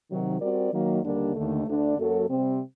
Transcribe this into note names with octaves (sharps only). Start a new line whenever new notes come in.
C3 D#3 F#3
G3 C4 F#4 A#4 D5
D#3 F#3 A#3
D#2 D3 G3 A#3 D4
D#2 D3 A3
D2 D3 A3 D4
F#2 F#3 A#3 F#4 A4
C3 G3 C4